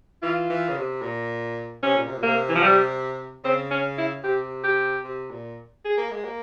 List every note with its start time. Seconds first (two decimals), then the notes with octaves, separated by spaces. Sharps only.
0.22 E3 F4
0.50 E3
0.69 C#3
0.76 C3
1.02 A#2
1.83 C3 C#4
1.96 A#2
2.08 C3
2.18 A#2
2.23 C3 A#3
2.49 E3
2.55 F3
2.63 G3
3.44 C#3 C4
3.71 C#4
3.98 E4
4.23 C3 G4
4.64 G4
5.04 C3
5.31 A#2
5.85 G#4
5.97 A#3
6.10 G#3
6.24 A#3